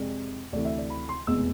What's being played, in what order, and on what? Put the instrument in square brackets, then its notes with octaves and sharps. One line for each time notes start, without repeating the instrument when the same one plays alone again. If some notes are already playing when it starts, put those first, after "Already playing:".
Already playing: [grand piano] F2 C3 G#3 D5
D2 C3 E3 A3 D5
E5
D5
B5
C6
F1 E2 B2 G#3 E6